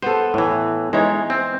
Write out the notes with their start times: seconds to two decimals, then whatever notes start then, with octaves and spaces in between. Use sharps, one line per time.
0.02 B3 A4 C5
0.34 A2 E3
0.93 E3 G#3 D#4 C#5
1.30 C4